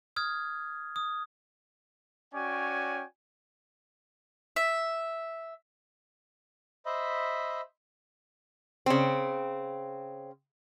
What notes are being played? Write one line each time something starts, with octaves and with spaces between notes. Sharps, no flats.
D#6 F6 G#6
D#6
C#4 F#4 C#5 D5 G5 G#5
E5
C5 D#5 E5 B5
C#3 C4